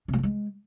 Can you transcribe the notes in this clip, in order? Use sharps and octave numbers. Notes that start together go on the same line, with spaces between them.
C3
F#3
A3
G#3